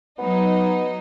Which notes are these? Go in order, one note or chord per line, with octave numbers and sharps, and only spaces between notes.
F#3 B3 D#4